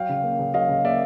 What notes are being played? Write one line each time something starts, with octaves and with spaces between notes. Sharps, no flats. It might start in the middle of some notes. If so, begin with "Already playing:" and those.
Already playing: F#3 F5 G5
C#3
A#3
C#3
F#3 D#5 F5
C#3
A#3 D5 E5